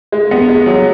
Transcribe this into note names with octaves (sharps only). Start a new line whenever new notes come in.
G#3
B3
G#3
F#3